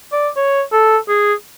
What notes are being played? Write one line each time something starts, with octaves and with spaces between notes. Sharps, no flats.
D5
C#5
A4
G#4